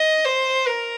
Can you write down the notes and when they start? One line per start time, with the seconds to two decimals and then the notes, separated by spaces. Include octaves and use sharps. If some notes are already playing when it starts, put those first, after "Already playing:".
Already playing: D#5
0.25 C5
0.66 A#4